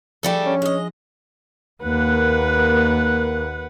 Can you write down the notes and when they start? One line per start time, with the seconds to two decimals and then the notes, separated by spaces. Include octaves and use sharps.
0.23 F3 G3 A3 D4 G#4 A4
0.46 C#4
0.62 G#3 D#5
1.83 D#2 A#3 B4 F#5